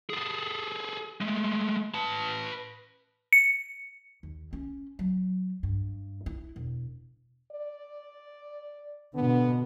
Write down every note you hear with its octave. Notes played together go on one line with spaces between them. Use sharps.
G#4 A4
G#3 A3
B4 A5
C#7
D#2
C#4
F#3
G2
E4
E1
D5
B2 D3 B3